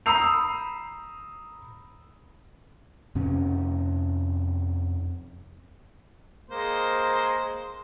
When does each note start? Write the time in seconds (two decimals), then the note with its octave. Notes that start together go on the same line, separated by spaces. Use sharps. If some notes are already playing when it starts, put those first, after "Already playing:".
0.06 A#5 B5 D#6 E6 C7 F7
3.15 F2 C3 C#4
6.50 G#3 A#3 C5